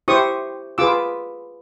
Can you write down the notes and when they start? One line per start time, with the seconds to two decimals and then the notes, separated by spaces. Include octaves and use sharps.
0.08 E4 G4 C5 C#6 D#6
0.78 F4 G#4 B4 D6 E6